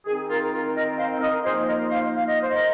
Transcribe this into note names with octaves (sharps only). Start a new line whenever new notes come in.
D#3 C4 D#4 G#4
F4 A#4
F4 A#4
A#4 D#5
C5 F5
A#4 D#5
F3 A#3 D#4 G#4 C5
A#4 D#5
C5 F5
F5
D#5
C5
A#4 D#5